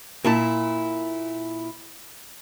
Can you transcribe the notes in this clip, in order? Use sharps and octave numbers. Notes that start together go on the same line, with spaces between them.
A#2 E4 A5